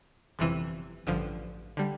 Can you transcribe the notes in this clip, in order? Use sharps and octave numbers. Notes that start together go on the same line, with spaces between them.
G1 F2 C3 E3
A1 G2 D3 F3
D3 G3